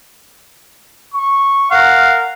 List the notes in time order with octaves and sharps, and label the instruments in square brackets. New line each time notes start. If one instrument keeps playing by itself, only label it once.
[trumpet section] C#6
[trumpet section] A#4 F#5 [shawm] F5